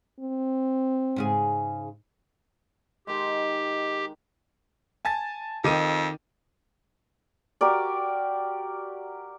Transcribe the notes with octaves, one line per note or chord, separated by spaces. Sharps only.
C4
G#2 C#3 G#4
D#3 G#3 G4
G#5 A5 A6
F2 D#3 D#5 D6 D#7
F#4 G4 A#4 D5